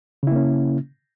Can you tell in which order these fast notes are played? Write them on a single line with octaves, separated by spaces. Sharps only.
C#3 E4 A#3 C#4